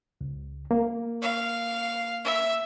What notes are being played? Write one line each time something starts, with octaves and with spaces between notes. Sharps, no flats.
C#2
A#3
F5
E5